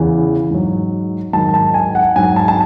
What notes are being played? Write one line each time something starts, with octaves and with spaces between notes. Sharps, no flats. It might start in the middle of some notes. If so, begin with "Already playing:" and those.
Already playing: E2 C#3 E3
G#2 F#3
G#2 D#3 F#3 A5
A5
G#5
F#5
G#2 F#3 G#5
A5
A5